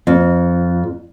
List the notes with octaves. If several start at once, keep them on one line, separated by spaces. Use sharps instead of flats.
F2